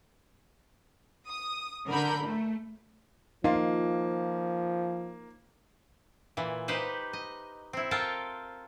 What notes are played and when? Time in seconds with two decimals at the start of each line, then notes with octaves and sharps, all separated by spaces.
1.28 D#6
1.90 D3 A#4 B5 G6
2.25 A3
3.44 F3 A#3 D#4 F4 F5
6.37 A#2 E3
6.68 D#4 G4 B4 C5
7.13 D#5
7.73 C4 E4
7.91 F4 A4 A#4 G5